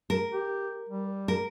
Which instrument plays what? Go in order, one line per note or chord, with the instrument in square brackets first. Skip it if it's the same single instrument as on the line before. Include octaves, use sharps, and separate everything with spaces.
[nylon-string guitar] A#4
[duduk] G4
G3
[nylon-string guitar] A#4